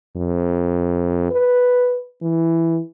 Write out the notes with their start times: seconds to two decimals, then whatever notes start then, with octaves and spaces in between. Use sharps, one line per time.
0.17 F2
1.31 B4
2.22 E3